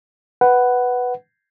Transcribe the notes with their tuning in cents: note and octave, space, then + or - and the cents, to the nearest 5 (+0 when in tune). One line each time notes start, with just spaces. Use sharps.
B4 +0 F#5 +10